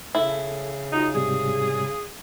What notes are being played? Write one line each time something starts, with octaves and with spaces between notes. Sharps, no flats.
C#3 E4 A4
D#4 F4 F#4 D#5
G#2 C3 G3 G#4